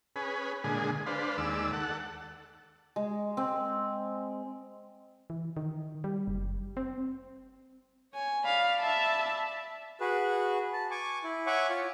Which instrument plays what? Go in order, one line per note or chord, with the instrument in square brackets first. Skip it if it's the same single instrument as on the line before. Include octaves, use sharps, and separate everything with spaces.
[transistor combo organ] C#4 G#4 B4
A#2 D3 G#3 G#4
D4 B4 C5 F5
D#2 G#3 D5 E6
A4 F#5
[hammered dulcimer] G#3
C4
[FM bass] E3
D#3
G3
F#1
C4
[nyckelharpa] C#5 G#5
[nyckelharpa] D5 B5 [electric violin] F5
[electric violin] E5 A5
[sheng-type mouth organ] F#4 G#4 B4
A5
G#5 C#6 D6
E4
C#5 E5 F#5 G#5 C#6 D6
F4 C#5